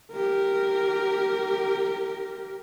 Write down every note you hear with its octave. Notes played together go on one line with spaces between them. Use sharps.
G4 A#4